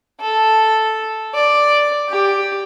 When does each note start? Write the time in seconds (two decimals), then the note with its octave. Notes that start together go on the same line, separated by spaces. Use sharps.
0.20 A4
1.35 D5
2.09 G4